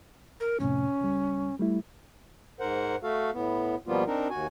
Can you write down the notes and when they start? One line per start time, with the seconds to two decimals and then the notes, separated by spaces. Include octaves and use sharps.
0.40 A#4
0.60 F2 A2 C3 C#4
1.01 C#2 G3
1.60 G3 A3 E4
2.60 G#2 A#4 C5 F#5
3.03 A3 F#4 A4 F5
3.33 A2 B3
3.87 B2 F3 G3 A#3 B3 F4
4.07 C4 D4 D#4 A#4
4.30 D#2 F#4 G#5